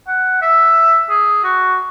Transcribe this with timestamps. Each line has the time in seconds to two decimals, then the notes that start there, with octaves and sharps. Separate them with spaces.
0.07 F#5
0.42 E5
1.09 G#4
1.44 F#4